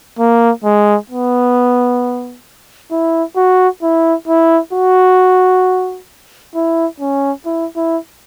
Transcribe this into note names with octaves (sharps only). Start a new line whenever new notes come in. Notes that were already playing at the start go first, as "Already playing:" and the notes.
A#3
G#3
B3
E4
F#4
E4
E4
F#4
E4
C#4
E4
E4